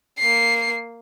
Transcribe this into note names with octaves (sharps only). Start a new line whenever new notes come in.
A#3 C7